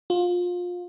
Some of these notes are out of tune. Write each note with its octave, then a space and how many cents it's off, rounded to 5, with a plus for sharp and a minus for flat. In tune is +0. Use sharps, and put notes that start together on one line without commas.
F4 +25